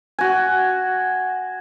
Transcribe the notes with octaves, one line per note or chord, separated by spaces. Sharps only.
F#4 G#5